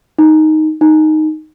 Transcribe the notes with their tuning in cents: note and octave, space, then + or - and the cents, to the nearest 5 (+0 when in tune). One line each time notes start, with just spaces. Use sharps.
D#4 +5
D#4 +0